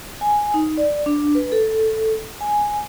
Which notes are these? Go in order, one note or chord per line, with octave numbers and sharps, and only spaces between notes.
G#5
D#4
D5
D4
B4
A4
G#5